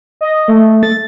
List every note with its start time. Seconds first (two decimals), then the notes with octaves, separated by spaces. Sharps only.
0.21 D#5
0.48 A3
0.83 A6